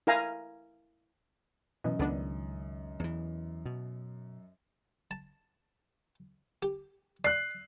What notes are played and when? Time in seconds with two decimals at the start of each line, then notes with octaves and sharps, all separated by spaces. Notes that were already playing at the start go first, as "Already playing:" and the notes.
0.07 E4 A#4 F5 G#5 A#5
1.84 F#2 B2 E3 D#5
1.99 C#2 D#3 A3 B3 D4
3.00 E2 E3
3.65 B2
5.11 A5
6.62 G4
7.24 D5 F#6 C7